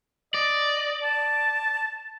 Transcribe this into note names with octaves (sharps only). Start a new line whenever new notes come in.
D5 D#5
A5